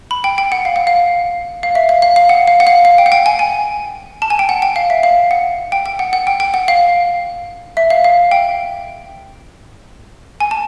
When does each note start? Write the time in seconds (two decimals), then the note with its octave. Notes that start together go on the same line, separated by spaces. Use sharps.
0.11 B5
0.24 G5
0.38 G5
0.52 F#5
0.65 F5
0.76 F#5
0.87 F5
1.63 F5
1.75 E5
1.89 F5
2.02 F5
2.16 F5
2.29 F#5
2.48 F5
2.60 F#5
2.67 F5
2.85 F5
2.98 G5
3.06 F#5
3.12 G5
3.26 G#5
3.39 G#5
4.22 A5
4.30 G#5
4.39 G5
4.49 F#5
4.62 G5
4.76 F5
4.90 E5
5.03 F5
5.31 F#5
5.72 G5
5.86 G5
5.99 F#5
6.13 F#5
6.27 G5
6.40 G5
6.54 F#5
6.68 F5
7.77 E5
7.90 F5
8.04 F5
8.31 G5
10.40 G#5
10.51 A5